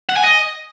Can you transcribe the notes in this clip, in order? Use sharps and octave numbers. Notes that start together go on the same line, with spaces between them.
F#5
G#5
D#5